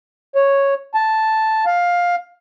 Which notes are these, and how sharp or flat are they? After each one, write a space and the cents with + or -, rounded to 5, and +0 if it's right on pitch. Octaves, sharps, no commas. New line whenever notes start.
C#5 -5
A5 +0
F5 +10